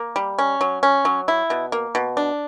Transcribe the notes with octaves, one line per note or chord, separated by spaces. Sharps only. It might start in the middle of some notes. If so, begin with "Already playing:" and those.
Already playing: A#3
G3
C#4
F#3
C#4
F#3
E4
B2
A#3
B2
D4